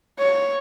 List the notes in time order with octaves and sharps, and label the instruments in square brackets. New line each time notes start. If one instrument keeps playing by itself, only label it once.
[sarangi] C#5